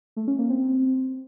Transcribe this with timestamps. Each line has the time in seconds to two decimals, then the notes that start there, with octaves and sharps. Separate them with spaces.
0.16 A3
0.28 C#4
0.39 A#3
0.50 C4